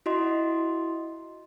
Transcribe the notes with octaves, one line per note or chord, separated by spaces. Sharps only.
E4 F#4 D#5 C6